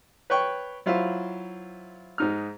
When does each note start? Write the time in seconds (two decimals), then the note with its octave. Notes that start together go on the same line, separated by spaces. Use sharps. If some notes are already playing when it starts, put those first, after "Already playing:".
0.30 B4 C#5 G5 C#6
0.86 F#3 E4 F4 C5 E5
2.18 G#2 D#4 F6